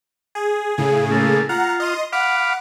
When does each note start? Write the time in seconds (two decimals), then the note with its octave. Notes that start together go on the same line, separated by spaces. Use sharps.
0.35 G#4
0.78 A2 C#3 G#4
1.11 A3 A#3
1.49 F4 F#5 A#5
1.80 D#5 C6 D#7
2.13 F5 F#5 B5 D6